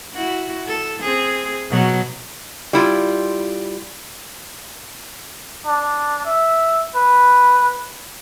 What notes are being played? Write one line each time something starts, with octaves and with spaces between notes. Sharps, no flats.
E4 F#4
A4
C4 G#4
B2 F#3
G3 E4 F4
D4
E5
B4